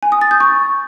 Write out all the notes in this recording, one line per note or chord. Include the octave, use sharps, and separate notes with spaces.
G#5
D#6
A6
G6
C#6